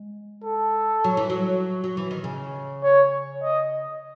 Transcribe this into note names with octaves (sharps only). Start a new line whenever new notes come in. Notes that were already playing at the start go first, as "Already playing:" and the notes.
Already playing: G#3
A4
F#3
E3
F#3
F#3
E3
D#3
C#3
C#5
D#5